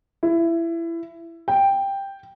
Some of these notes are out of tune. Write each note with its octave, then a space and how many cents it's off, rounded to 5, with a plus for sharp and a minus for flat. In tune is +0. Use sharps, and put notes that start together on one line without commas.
E4 +20
G5 +5